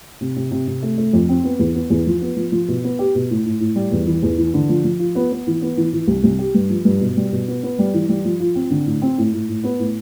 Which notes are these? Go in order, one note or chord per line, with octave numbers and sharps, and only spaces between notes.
C3
C3
C3
C3
A3
A3
F2
C4
B3
E2
B3
E2
F3
B3
F3
F3
B2
B3
G4
B2
A2
A2
A2
G3
E2
E3
E2
E3
D3
F3
F3
F4
B3
B3
E3
B3
E3
E3
C2
C2
G4
G2
F3
G2
B2
G3
B2
B3
B3
G3
E3
G3
F3
F4
C4
D3
A2
C4
A2
A2
A2
B3
A2